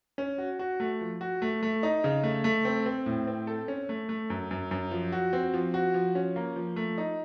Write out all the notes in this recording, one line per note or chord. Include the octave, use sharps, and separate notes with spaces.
C#4
F#4
F#4
A3
F3
F#4
A3
A3
D#4
C#3
A3
A3
C4
C4
A2
C4
A4
C#4
A3
A3
F#2
F#2
F#2
F3
F#4
C4
F3
F#4
F3
C#4
A#3
F3
A3
D#4